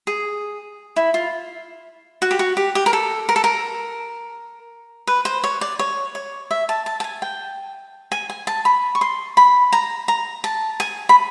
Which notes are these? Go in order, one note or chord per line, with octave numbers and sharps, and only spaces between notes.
G#4
E4
F4
F#4
G4
F#4
G4
G4
A#4
A4
A#4
A4
A#4
B4
C5
C#5
D5
C#5
C#5
E5
A5
A5
A5
G#5
G5
G#5
G#5
A5
B5
C#6
C6
B5
A#5
A#5
A5
G#5
B5